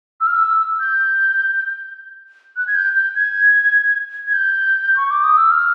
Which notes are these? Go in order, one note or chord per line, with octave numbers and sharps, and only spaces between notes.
E6
F6
E6
G6
F#6
G#6
G6
G6
G#6
G#6
G6
C#6
D6
D#6
E6
F6